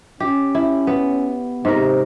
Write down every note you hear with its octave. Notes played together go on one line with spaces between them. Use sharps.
C#4 G4
E4
B3
G#2 C3 A#4